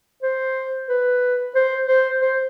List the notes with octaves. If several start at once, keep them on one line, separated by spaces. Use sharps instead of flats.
C5
B4
C5
C5
C5